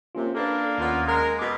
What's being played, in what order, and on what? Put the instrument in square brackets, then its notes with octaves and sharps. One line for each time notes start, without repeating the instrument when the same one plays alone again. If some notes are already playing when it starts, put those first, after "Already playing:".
[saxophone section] C3 [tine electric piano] A#3 C#4 F4
[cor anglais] A#3 [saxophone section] D4 [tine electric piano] A4 B4
[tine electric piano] D#2 C#4 [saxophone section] B3 F4
[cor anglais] G#3 [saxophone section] A#4
[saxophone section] B2 [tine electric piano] D6